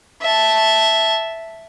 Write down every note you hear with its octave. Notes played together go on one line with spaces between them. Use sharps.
E5 A5